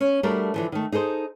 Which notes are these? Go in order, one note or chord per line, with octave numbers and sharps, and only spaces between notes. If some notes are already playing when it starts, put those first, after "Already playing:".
C#4
G3 A3 D4 F#4 A#4
D3 E3 F3
D#3 A3
D#4 G#4 A4 C5